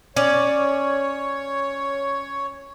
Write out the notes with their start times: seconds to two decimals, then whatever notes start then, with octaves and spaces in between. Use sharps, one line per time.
0.16 C#4 C#5 D5